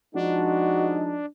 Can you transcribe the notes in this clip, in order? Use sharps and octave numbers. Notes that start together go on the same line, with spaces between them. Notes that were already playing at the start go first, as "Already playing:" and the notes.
F3 G#3 D4 D#4 F#4